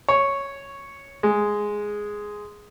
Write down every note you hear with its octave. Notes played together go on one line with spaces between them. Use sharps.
C#5
G#3